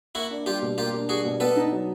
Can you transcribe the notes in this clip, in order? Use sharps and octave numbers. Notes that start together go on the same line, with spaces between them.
A#3 E4 F#4
D4
G3 F4 G4
B2
A#3 F4 G4
D4
G3 F#4 G#4
B2
B3 A4 B4
D#4
F#3